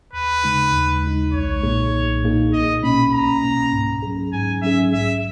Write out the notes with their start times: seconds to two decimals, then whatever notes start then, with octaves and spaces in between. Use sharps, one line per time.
0.13 D#2 B4
0.44 C#3 G#3 D#4
0.73 D#2
1.03 C#3 G#3 D#4
1.33 B1 C#5
1.63 A#2 A#3 D#4 G#4
1.93 B1
2.23 A#2 A#3 D#4 G#4
2.53 C#2 D#5
2.82 B2 A#3 C#4 B5
3.12 C#2 A#5
3.42 B2 A#3 C#4
3.72 G#2
4.02 F#3 C#4 G#4
4.32 G#2 G#5
4.62 F#3 C#4 G#4 E5
4.93 A#1 E5